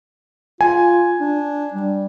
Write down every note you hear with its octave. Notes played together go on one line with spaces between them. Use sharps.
F4 G#5
D4
G3